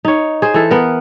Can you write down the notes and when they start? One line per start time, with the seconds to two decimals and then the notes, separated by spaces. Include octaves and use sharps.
0.05 D#4 C#5
0.42 G#4 C5
0.54 E3 A4
0.71 B3 A#4